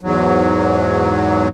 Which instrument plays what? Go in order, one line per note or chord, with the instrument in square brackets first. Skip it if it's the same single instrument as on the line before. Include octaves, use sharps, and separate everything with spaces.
[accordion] E2 G#2 F#3